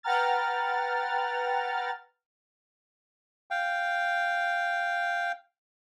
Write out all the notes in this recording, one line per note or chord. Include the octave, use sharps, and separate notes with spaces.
B4 F#5 G5 A#5 F6 A6
F5 G5